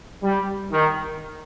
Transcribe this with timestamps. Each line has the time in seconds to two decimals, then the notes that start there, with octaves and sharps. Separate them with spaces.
0.24 G3
0.71 D#3